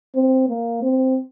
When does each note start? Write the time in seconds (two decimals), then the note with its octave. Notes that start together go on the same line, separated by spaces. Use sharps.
0.16 C4
0.49 A#3
0.83 C4